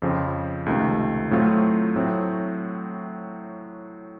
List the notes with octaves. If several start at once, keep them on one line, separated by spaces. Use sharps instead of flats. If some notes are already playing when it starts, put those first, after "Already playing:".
F2 C#3 F3 C4
C#2 C3 D#3 A3
A2 F#3 A3 C4 F4
A2 F#3 A3 C4